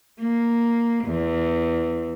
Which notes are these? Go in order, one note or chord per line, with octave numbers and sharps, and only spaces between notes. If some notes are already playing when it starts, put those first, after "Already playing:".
A#3
E2